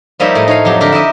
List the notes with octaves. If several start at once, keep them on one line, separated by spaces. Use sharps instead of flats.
F3 G3 A#3 D#4 C#5 E5
A2 A3 D#5
D#4 C#5 F5
F2 F#3 G4
D3 G4 A#4
E4 G4 D#5 E5